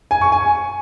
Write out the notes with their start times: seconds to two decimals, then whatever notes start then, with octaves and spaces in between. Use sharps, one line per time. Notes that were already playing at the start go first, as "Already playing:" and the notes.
0.11 G#5
0.21 C#6
0.32 G#5